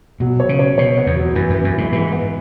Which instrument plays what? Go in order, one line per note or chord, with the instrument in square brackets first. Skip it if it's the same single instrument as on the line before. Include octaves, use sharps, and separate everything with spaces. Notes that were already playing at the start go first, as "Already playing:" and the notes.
[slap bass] B2 [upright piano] F#3
[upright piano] C#5
[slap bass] C#3
[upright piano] C#5
[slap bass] B2 [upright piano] C#5
[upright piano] B3
[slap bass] E2
[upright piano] F#3
[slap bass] F#2 [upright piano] E3
[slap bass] F#2 [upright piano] E3
[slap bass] F#2
[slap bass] G#2 [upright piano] E3
[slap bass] G#2 [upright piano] E3
[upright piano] B3